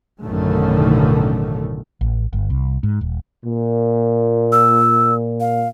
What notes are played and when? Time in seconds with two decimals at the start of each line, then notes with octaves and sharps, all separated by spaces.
0.22 A1 F#2 B2 D3 D#3 A3
2.01 A1
2.33 G1
2.50 C2
2.83 G#2
3.01 D#1
3.45 A#2
4.52 E6
5.40 F5